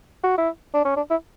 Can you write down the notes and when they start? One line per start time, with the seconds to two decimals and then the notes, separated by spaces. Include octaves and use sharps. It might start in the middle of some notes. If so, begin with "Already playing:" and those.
0.23 F#4
0.38 E4
0.74 D4
0.85 C#4
0.96 D4
1.10 E4